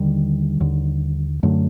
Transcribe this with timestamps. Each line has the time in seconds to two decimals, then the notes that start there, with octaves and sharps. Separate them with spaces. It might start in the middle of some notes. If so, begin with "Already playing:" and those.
Already playing: D#2 D3 D#3 G3
0.60 D#2 D3
1.43 F#2 D3 F#3 A3